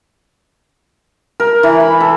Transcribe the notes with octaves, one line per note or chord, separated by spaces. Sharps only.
A#4
E3
B5
A4